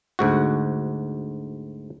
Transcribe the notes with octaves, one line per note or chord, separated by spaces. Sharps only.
D2 G#2 F#4